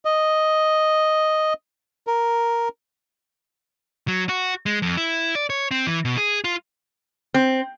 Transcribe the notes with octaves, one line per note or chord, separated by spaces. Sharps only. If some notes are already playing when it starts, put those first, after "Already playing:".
D#5
A#4
F#3
F#4
G#3
F2
E4
D5
C#5
C4
E3
B2
G#4
F4
C4